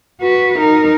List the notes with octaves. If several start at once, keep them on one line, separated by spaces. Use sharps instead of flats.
F#4 B4
D#4 A#4